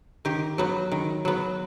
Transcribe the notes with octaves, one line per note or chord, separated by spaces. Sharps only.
D#3 G4
F#3 B3
D#3
F#3 B3